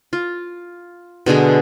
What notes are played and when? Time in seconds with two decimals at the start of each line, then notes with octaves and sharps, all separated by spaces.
0.13 F4
1.26 B2 D3 G#3 G#4